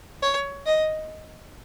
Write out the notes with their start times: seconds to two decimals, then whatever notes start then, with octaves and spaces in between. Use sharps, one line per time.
0.22 C#5
0.66 D#5